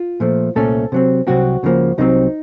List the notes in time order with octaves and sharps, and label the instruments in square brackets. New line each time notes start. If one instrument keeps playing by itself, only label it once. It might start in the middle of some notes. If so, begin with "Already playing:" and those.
Already playing: [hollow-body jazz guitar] F4
A#2 F3 A3
C2 A#2 A3 C#4 A4
C3 F#3 C4
C2 C3 F#3 C4 F#4
C#2 C#3 F3 A#3
C2 C3 F#3 A3 C4 D#4